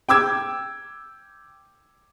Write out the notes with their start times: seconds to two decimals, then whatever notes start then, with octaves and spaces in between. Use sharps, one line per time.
0.09 G5 D6 E6 G#6